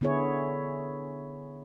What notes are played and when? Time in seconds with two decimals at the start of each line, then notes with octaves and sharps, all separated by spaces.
0.01 D3 B3 E4 G#4 C#5